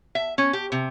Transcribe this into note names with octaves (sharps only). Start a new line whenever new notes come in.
E5
C#4
G4
C3